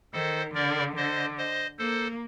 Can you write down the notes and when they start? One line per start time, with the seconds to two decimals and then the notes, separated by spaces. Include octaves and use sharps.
0.13 D#3 A4 C5
0.54 D3 A#4 D5
0.96 D3 C5 D#5
1.37 C5 D#5
1.79 A#3 A4 C5